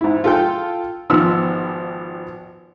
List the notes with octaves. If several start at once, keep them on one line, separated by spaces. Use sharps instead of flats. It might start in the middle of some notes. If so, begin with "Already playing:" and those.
G#2 E4
F4 A4 G5
G#1 F3 B3 E6 F6